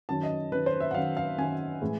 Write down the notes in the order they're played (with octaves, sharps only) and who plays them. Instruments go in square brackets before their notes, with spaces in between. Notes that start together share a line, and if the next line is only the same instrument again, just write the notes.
[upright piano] F#2 D#3 F#3 A5
D#5
F#2 D#3 F#3 B4
C5
E5
F#5
F#2 D#3 F#3 F5
F5
F#2 D#3 F#3 G#5
A2 E3 G#3